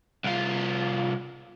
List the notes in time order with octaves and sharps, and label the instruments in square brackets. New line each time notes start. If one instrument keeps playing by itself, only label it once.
[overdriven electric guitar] C2 F4